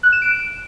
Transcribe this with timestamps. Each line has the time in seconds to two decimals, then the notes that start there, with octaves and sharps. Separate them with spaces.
0.03 F#6
0.12 E7
0.22 D7